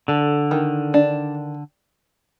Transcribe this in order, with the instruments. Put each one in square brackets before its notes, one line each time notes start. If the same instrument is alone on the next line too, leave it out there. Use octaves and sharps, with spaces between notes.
[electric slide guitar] D3 [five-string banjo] A4
[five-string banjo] D#3
D4